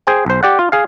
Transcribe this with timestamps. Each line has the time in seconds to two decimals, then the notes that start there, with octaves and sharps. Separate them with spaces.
0.07 G#4 C5 G5
0.26 B1 C5
0.43 G4 D5 F#5
0.59 F4
0.72 G#4 F5